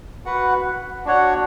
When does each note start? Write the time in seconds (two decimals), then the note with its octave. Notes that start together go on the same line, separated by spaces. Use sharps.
0.26 F#4 B4 F#5
1.05 D4 F#4 C#5 F#5